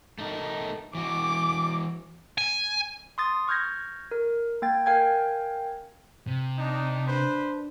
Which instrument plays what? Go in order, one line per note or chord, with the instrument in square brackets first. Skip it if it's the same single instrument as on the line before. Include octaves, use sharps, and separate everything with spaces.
[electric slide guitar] A3 D#4 A#4
[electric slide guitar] E3 F#4 [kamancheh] D6
[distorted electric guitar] G#5
[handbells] C6 D#6 A6
C#6 F6 G6 G#6 A#6
A#4
A#3 G5 A6
A#4 F5 G5 G#5 G#6
[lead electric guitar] C3
[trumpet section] D4 D#4
[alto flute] D4 [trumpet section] B4 C5